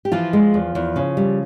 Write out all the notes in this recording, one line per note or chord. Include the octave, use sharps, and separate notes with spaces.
G4
E3 F3 F4
G#3
E2
E2
C#3
G3